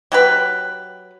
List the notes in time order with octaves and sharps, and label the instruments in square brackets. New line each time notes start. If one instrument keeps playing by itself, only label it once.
[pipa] F#3 G4 B4